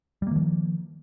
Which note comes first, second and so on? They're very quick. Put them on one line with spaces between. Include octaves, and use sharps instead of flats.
G3 A#3 D#3 F3